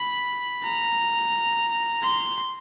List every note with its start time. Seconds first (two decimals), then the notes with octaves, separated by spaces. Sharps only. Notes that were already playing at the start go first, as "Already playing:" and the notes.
Already playing: B5
0.64 A#5
2.03 C6